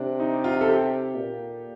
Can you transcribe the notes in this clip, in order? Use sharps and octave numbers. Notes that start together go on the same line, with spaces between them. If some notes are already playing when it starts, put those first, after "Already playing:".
Already playing: C3 D4
D#4
F4
A4
G4
A#2